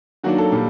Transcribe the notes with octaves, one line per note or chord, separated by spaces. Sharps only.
D#3 F#3 A#3 D4 F#4
A4
A#2 G3